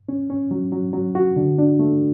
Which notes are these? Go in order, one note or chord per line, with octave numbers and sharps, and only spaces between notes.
C#4
C#4
F#3
F#3
F#3
F#4
D3
D4
A3